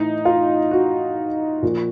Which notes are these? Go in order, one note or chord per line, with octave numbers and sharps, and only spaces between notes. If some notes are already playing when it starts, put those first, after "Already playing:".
Already playing: A2 E3 D#4
F4
F#4
A#2 F3